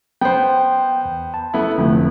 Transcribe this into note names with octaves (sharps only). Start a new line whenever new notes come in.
B3 C5 G5
E2
A5
A3 B3 E4
F1 D3 F3 A3